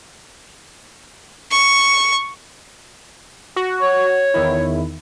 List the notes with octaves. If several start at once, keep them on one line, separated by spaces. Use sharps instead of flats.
C#6
F#4
C#5
E2 D#3 E4